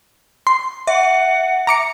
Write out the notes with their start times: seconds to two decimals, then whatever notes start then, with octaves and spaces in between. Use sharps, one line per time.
0.47 C6
0.87 E5 F#5
1.67 A#5 D6 C#7